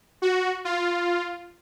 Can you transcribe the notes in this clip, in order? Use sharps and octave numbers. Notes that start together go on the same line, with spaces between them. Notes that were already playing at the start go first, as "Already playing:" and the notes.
F#4
F4